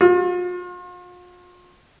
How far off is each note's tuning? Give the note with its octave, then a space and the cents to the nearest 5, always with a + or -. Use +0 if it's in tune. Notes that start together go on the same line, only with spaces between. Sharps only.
F4 +40